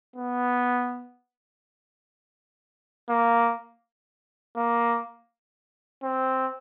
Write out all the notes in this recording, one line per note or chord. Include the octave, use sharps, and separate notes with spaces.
B3
A#3
A#3
C4